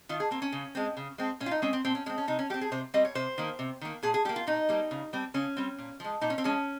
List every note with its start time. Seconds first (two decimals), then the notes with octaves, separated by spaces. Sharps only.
0.09 D#3 F4
0.20 G#4
0.31 A#3 C4
0.42 C#4
0.52 C#3
0.75 G#3 C4
0.97 C#3
1.18 G#3 C4
1.40 A#2 C#4
1.46 F4
1.51 D#4
1.62 G#3 C4 C#4
1.73 C4
1.85 A#2 C4
1.95 C#4
2.06 G#3 C#4
2.10 C4
2.18 C#4
2.28 C3 D#4
2.39 C#4
2.50 G3 G4
2.54 C4
2.61 G#4
2.72 C3 C5
2.94 G3 C4 D#5
3.05 C#5
3.15 C3 C5
3.38 D#3 A#3
3.59 C3
3.81 D#3 A#3
4.03 A#2 G#4
4.14 G#4
4.25 G3 G4
4.29 A#3
4.36 F4
4.47 A#2 D#4
4.69 G3 A#3
4.91 C#3
5.13 G3 C4
5.34 C#3 C#4
5.57 G3 C4
5.78 A#2
6.00 F3 G#3
6.21 A#2 D#4
6.30 C#4
6.38 C4
6.44 F3 G#3 C#4